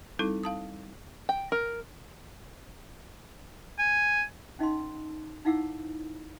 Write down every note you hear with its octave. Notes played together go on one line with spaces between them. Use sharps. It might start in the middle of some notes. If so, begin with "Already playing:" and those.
G3 C4 D#4 E4 A4
F5 A5 D#6
G5
A#4
G#5
C#4 D#4 D#5 F5 A5 C6
D#4 E4 F5 F#5 D6 E6